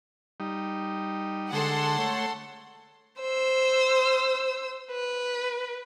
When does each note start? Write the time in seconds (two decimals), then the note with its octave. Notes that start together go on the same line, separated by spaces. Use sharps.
0.40 G3 D#4
1.53 D3 G#3 A4 F#5 C6
1.98 A3 C#5
3.20 C5 E6
4.91 B4